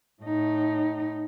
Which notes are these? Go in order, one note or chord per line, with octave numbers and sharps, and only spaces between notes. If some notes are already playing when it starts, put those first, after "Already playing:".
A2 D#4